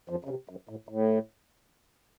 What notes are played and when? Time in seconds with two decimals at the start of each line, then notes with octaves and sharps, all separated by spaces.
0.09 F2 F3
0.25 C#3
0.29 C3
0.49 F#2
0.69 A2
0.89 A2